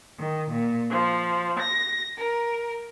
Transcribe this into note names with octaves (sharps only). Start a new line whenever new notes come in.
D#3
A#2
F3
A#6
A#4